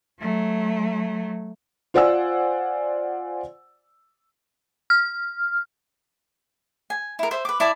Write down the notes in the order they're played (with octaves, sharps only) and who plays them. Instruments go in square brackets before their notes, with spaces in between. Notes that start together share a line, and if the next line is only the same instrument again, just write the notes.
[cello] F#3 A3
[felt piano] F4 C5 D5 F#5 G#5 E6
[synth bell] F6
[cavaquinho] G#5
E4 A#4
C5 E5
B4 D6
E4 D5 A5 D6